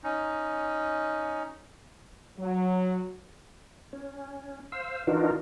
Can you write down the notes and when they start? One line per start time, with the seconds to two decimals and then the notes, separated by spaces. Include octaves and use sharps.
0.04 C#4 D#4
2.38 F#3
3.93 C#4
4.72 C5 F5 E6
5.07 E3 D4 D#4 F4 F#4 A#4